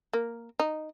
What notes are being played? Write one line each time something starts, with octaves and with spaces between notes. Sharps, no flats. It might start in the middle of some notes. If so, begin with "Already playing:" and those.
A#3
D#4